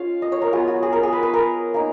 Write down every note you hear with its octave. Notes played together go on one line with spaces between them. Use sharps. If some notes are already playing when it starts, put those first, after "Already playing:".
Already playing: G#3 C#4 F4 C#5 F5
D#5
C#5
A#4
F#3 B3 F4 G#4
F#4
G#4
A#4
G#4
B4
B4
A#4
A#3 D#4